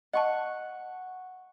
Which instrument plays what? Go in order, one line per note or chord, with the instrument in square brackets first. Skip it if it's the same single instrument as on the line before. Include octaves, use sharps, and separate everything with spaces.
[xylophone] D#5 A5 [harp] F#5 C#6